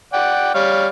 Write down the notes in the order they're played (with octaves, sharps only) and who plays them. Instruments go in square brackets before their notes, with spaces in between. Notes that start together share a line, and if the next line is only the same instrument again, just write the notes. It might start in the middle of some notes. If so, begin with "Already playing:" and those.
[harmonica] D5 F#5 G5
G3 C#5 F5